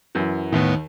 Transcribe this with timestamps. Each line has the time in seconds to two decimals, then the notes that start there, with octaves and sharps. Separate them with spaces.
0.15 F#2 E3
0.52 D#2 A2 D#3 B3